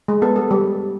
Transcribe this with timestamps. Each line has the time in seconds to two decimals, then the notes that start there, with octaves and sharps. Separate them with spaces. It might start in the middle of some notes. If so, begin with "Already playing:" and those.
0.08 G#3
0.22 B3 A4
0.36 G3 A4
0.51 G3